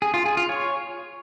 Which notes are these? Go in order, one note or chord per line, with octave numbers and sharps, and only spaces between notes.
G#4
F4
G#4
F4
C#5